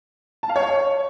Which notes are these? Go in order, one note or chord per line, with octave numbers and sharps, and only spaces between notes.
A5
F5
C#5